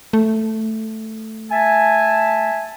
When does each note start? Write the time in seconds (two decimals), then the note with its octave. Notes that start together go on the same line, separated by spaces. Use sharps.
0.13 A3
1.52 E5 G#5 A5